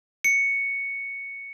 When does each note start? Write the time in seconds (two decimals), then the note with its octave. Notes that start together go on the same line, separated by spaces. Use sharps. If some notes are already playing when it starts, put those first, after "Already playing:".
0.24 C#7